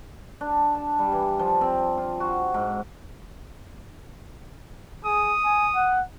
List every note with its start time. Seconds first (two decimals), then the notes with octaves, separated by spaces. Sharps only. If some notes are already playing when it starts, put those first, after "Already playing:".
0.41 D4
0.75 A5
0.99 G3
1.12 E3
1.39 F3
1.61 C4
1.97 F4
2.20 F#4
2.54 G#2
5.05 G#4 D#6
5.45 G#5
5.75 F#5